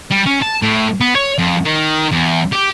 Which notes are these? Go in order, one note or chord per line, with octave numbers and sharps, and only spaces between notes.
G3
C#4
A5
A2
B3
C#5
F2
D#3
E2
G4